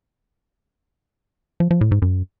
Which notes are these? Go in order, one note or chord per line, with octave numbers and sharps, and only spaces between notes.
F3
F3
A2
G#2
F#2